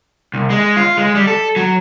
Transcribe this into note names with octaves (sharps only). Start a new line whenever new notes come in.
C2
G#3
F4
G#3
G3
A4
F#3